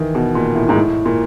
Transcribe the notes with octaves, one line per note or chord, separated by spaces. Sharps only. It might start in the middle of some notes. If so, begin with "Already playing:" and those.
Already playing: D#3 E3
B2
A#2
A2
G#2
A2
A#2